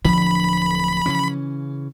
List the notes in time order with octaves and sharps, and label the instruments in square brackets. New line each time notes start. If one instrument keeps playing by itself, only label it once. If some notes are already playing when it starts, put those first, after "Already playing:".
[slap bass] D1 D3 [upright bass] F3 [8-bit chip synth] B5
[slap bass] C#3 E3 C#4